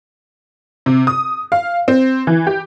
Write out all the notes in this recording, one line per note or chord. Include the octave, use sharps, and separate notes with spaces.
C3
D#6
F5
C4
E3
G4